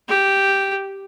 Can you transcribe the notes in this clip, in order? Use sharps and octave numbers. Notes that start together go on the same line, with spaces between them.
G4